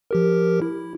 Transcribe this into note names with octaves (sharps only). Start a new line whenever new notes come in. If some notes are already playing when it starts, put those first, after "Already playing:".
F3 G4 A#4
E4